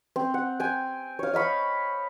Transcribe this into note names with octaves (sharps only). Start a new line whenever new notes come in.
C4
F#5
G5 G#5
C#5 F5
D#5 F5 B5 C#6